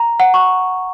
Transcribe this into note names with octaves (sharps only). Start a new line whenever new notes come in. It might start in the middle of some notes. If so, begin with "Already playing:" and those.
Already playing: A#5
F#5
C#6